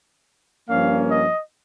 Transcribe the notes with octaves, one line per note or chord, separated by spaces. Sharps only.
G2 F3 A#3 C#4 F5
D#5